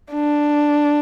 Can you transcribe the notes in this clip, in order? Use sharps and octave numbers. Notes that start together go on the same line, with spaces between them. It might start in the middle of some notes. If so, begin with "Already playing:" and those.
D4